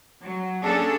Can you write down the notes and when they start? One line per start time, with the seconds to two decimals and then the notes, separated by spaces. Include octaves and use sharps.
0.22 F#3
0.63 A#3 C#4 D4 G#4 A4